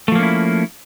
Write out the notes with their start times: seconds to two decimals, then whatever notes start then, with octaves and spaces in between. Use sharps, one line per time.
0.08 A3
0.12 F3
0.15 A#3
0.19 C#4
0.23 E4